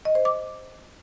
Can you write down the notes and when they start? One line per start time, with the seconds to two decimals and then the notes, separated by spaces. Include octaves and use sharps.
0.05 D#5
0.15 C5
0.25 D6